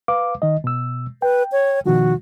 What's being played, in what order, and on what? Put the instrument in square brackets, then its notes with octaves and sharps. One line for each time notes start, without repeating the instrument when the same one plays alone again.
[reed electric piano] B4 F5 D6
D#3 D#5
B2 E6
[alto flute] B4 [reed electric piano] G5
[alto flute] C#5
[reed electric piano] B2 D#3 F3 [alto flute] F#4